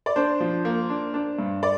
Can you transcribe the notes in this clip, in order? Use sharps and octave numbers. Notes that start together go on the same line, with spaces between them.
D5
D4 C5
F3
A#3
D4
D4
G2
D5